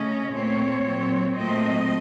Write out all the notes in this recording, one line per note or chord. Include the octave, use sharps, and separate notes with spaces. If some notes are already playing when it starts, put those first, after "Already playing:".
Already playing: C#3 A3 C#4 D#5
A#2 A3 C4 C#5
A#2 F#3 C4
A#2 F#3 A3 C4 D#5